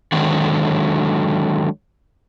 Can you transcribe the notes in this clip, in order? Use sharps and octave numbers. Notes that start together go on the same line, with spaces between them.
D3 D#3 F#3 G#3